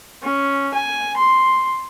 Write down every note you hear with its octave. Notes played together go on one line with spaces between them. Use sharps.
C#4
G#5
C6